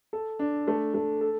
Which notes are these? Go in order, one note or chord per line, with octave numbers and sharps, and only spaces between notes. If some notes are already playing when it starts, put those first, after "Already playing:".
A4
D4
A3
A3
A4